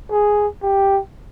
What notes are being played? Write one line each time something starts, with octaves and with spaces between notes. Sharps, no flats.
G#4
G4